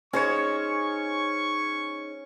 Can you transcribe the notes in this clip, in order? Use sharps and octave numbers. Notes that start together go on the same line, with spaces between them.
C#4 D#4 G#4 C5 C#5 C#6